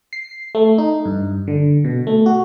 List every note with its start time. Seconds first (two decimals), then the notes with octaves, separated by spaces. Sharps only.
0.13 C7
0.55 A3
0.78 D#4
1.05 G2
1.48 D3
1.84 B2
2.07 A3
2.26 F#4